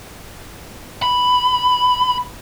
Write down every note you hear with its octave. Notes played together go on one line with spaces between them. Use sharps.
B5